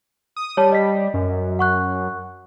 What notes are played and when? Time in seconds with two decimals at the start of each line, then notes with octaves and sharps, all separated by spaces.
0.37 D#6
0.57 G3 C#5 A5
0.72 D#5 B6
1.14 F#2
1.59 F#5 C#6 F#6